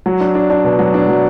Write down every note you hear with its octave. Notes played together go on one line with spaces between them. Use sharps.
F#3
D4
D4
D4
B2
F#3
D4
F#3